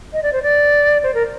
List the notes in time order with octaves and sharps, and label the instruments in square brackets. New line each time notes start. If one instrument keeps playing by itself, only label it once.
[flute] D#5
D5
C5
D5
C5
A#4